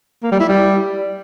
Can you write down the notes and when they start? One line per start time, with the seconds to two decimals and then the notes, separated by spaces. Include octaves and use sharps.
0.23 A#3
0.32 G3
0.40 E4
0.49 G3